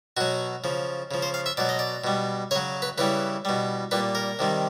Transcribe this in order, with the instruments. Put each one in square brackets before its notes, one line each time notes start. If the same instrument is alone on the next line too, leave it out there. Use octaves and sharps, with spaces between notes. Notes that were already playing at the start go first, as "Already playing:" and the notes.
[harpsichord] B2 F#3 F#4
C#3 F3
C#3 F3
C5
F5
E5
B2 F#3 D5
D#5
D5
B2 G3
C#3 F#3 C#5
B4
C#3 E3 G3 B4
B2 G3
A#2 G3 B4
A#4
C3 D#3 G3